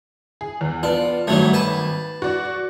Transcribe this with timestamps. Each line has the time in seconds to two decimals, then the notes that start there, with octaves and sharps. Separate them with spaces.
0.41 G#4
0.61 E2
0.83 B3 D4 F4
1.27 G#1 G2 F#3 A3
1.53 B4 A5
2.22 F#4 D5